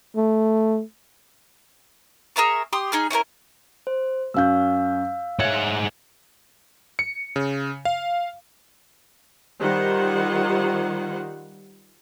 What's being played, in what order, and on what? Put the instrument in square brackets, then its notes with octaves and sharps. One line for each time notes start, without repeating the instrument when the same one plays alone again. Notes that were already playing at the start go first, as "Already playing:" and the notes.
[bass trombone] A3
[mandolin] G#4 A#4 E5 C#6
G4 C6 D#6
D#4 G#4 F6
C#4 E4 G#4 A#4
[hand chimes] C5
[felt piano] F#2 C#4 G6 [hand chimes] F5 E6
[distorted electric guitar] G#2 F#5 [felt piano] C#5 E5 G#6
[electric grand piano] C#7
C#3
F5
[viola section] D#3 G3 F4 C5 F#5